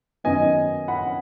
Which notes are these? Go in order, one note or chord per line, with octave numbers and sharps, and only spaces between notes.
F#2 D#3 F#3 B3 D#5 G#5
F#5 B5